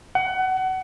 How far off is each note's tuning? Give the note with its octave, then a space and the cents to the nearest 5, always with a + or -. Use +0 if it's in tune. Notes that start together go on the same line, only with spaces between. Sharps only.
F#5 +25